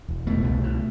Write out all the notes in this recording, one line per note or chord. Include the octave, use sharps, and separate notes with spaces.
E1
B2 A3
C2
B2